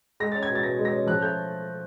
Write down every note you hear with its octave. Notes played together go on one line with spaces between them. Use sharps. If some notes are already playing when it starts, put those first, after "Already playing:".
G#3 A#6
C#4 A6
G#6
B2
A6
B2 A#6
G#3
A#6
C#4
F3 F#6
A3 G6